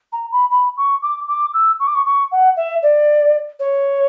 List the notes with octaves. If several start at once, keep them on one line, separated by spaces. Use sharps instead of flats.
A#5
B5
B5
C#6
D6
D6
E6
C#6
D6
C#6
C#6
F#5
E5
D5
C#5